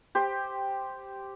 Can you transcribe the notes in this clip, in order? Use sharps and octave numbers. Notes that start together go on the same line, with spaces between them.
G4 C5